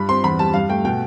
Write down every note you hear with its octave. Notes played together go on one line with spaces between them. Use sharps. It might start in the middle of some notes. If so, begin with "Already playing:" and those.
Already playing: G2 B5
C4 C6
E2 B5
G3 A5
G2 F5
A3 G5
B2 G5